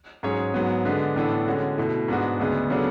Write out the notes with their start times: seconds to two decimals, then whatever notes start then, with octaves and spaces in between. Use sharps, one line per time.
0.23 G#2 F#3 C#4 G#4 C#5
0.54 G#2 F#3 B3
0.85 D3 G#3 B3 D4
1.16 A2 E3 B3 D4 A4
1.46 D3 G#3 C#4 F#4
1.78 B2 A3 E4
2.08 G#2 G#3 B3 D4 F#4
2.39 D2 C#3 G#3 B3 D4
2.70 C#3 F#3 B3 D4 A4